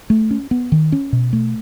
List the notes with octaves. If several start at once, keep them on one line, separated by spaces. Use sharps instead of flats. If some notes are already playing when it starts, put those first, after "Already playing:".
A3
C#4
B3
D#3
C#4
B2
A3